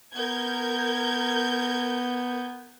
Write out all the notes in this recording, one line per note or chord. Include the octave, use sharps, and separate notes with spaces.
B3 A#4 G6 G#6